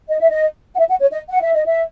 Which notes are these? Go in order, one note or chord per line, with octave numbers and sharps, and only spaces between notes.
D#5
E5
D#5
F#5
E5
F#5
C#5
D#5
F#5
E5
D#5
E5